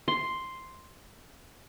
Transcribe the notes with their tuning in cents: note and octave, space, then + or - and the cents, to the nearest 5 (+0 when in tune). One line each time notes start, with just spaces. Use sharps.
C6 +0